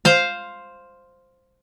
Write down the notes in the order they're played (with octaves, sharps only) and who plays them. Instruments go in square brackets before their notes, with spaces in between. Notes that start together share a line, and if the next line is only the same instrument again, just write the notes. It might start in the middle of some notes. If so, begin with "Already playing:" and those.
[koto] C5 F5